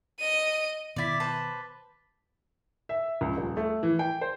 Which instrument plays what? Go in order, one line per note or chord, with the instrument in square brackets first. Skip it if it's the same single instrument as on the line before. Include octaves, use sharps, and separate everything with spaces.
[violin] D#5 D#7
[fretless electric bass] B2 D#3 B3 [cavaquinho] E4 D5 [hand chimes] D6 A6 B6
[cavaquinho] B4 C5 A5
[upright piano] E5
C#2
D#1
A3
E3
G5
C5